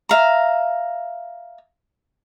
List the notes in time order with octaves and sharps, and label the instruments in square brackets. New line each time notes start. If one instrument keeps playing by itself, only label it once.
[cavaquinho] E5 F5 A#5